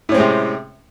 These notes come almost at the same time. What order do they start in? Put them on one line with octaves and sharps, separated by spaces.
A2 C#4 C4 G#3 C3